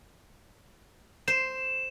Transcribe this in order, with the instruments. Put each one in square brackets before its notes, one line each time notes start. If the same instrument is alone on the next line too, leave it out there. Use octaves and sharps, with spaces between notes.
[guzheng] C5 [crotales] E7